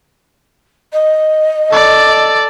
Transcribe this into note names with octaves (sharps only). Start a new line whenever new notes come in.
D#5
A4 D5